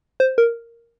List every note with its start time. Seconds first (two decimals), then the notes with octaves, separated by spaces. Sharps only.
0.20 C5
0.38 A#4